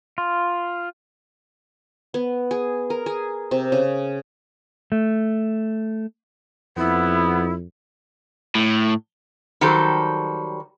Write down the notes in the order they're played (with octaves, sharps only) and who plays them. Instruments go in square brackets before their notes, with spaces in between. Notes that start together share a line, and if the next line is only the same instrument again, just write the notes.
[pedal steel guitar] F4
[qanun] B3
G#4
A#4
G#4
C3
C#3
[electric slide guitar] A3
[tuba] F2 [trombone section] B3 [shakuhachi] E4
[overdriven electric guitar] A2
[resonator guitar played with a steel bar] D#3 F#3 G3 A4 C5